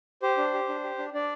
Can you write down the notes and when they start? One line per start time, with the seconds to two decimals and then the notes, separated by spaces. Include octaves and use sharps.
0.22 G4 C5
0.37 D4
0.54 G4
0.68 D4
0.84 G4
0.98 D4
1.14 D4 D5